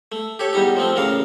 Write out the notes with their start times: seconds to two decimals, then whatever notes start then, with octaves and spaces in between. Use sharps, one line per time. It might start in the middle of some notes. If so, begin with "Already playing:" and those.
0.12 A3
0.39 G4 A4 C#5
0.53 E2 G3 D#4 G4
0.76 F3 A3 C4
0.96 A1 C#3 A#4 D5 F5